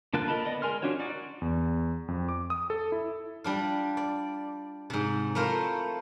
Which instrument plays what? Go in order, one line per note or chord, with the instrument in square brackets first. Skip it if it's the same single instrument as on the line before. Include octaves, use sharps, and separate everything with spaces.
[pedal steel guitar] D3 A#3 F4 A5 F#6
A#4 D#5 A5 B5
B3 D5 D#5
G#3 A#4 G#5 C6 F6
C#4 D4 F4 F#4 C#5
D#4 F#4 D5
[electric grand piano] E2
F2
D6
D#6
A4
E4
[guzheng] G3 D4 F4
D5
G#2 C3
A3 E4 F4 A#4 C5 C#5